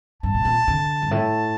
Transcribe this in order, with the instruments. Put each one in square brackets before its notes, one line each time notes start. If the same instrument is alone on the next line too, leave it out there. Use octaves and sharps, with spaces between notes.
[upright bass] G2 [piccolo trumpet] A5
[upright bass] A#2
A#2
D3
G2
[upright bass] A2 [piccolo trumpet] A5